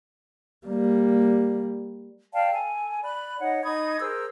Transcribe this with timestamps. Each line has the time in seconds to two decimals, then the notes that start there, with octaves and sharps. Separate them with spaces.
0.67 G3 A#3
2.33 D5 F5 G5 A5
2.53 A4 G#5
3.03 D5 B5 F#6
3.39 D#4 C#5 F#5
3.64 D#4 B5 D#6 G#6
4.00 G#4 A#4 C5 E6